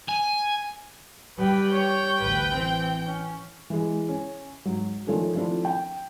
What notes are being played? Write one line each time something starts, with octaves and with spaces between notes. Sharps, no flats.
G#5
G3 B4 G5
C#5 G5
A1 D2 B4
E3 C4
C#4
E3 G#3
C#4
G#2 F#3
D#3 F3 A3 C#4 D4
F3 A3 C4 D4 E4 F4
G5